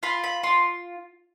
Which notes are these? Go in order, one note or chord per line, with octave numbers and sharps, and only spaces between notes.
F4 B5
B5
F4 C6